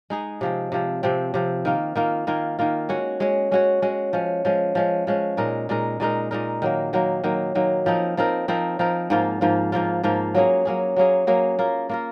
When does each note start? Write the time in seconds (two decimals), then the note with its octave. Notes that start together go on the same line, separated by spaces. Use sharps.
0.10 G#3 D#4 G#4
0.41 C3 F3 C4
0.72 C3 F3 C4
1.03 C3 F3 C4
1.34 C3 F3 C4
1.65 D#3 A#3 F4
1.96 D#3 A#3 F4
2.27 D#3 A#3 F4
2.59 D#3 A#3 F4
2.89 G#3 C#4 F#4 C#5
3.20 G#3 C#4 F#4 C#5
3.51 G#3 C#4 F#4 C#5
3.82 G#3 C#4 F#4 C#5
4.13 F3 G#3 C#4
4.45 F3 G#3 C#4
4.75 F3 G#3 C#4
5.07 F3 G#3 C#4
5.37 A#2 G#3 D#4 A#4
5.69 A#2 G#3 D#4 A#4
6.00 A#2 G#3 D#4 A#4
6.31 A#2 G#3 D#4 A#4
6.62 D#3 F#3 A#3
6.93 D#3 F#3 A#3
7.24 D#3 F#3 A#3
7.55 D#3 F#3 A#3
7.86 F3 C4 D#4 A#4
8.17 F3 C4 D#4 A#4
8.48 F3 C4 D#4 A#4
8.79 F3 C4 D#4 A#4
9.10 G#2 F3 A#3 F4
9.41 G#2 F3 A#3 F4
9.72 G#2 F3 A#3 F4
10.03 G#2 F3 A#3 F4
10.35 F#3 A#3 C#4 G#4
10.65 F#3 A#3 C#4 G#4
10.96 F#3 A#3 C#4 G#4
11.27 F#3 A#3 C#4 G#4
11.59 A#3 F4 A#4
11.89 A#3 F4 A#4